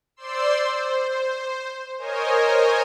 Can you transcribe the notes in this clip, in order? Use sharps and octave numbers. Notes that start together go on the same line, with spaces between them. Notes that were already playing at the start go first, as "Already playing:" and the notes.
C5 D5 C6 E6
C5
A#4 C5 C#5 D#5 G#5